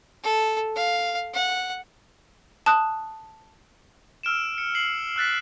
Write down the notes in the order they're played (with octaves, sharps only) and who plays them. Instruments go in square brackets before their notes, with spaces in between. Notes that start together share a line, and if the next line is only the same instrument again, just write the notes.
[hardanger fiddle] A4
F5
F#5
[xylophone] A5 D#6 F#6
[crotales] E6 F6 D7 E7
C#7
C7 F#7
E6 F#6 A6 B6